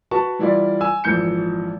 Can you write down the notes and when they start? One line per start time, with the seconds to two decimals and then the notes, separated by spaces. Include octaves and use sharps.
0.11 F#4 B4 A5 C#6
0.39 E3 G3 E4 F4 D5
0.81 G#5 E6
1.04 G#1 F2 A#2 E3 G6 C#7